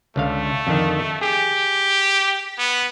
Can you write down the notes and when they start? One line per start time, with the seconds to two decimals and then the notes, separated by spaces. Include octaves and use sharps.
0.16 C#2 D3 A3 F5
0.67 F2 D3 D#3
1.21 G4 G#4
2.58 B3